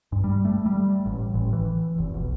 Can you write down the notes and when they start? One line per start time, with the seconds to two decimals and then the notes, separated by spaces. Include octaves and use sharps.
0.12 G2
0.24 G3
0.45 A3
0.66 G3
1.06 A1
1.34 A1
1.53 E3
1.98 F1
2.14 B1